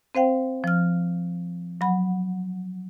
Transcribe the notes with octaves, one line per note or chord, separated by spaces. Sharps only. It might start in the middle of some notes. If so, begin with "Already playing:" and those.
C4 C5 F5 G5
F3 F6
F#3 F#5 B5